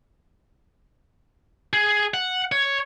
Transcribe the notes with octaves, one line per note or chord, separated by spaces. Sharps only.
G#4
F#5
C#5